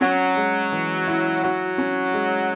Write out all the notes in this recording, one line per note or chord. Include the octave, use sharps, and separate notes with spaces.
F#3 C#4
G#3
E3
E4
F#3 F#4
C#4
G#3